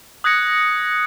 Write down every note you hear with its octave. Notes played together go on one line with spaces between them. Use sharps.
D#6 F#6 G#6 A#6 C#7